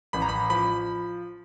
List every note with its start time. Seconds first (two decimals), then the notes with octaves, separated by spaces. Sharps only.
0.13 A1 B5
0.22 A#5
0.29 B5
0.50 F3 B5